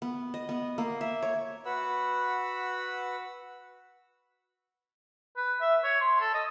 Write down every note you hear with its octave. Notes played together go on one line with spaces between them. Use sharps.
B3
D#5
B3
A#3
E5
C#5
F#4 B4 F#5 B5 E6
B4
E5
C#5
C6
A4
D#5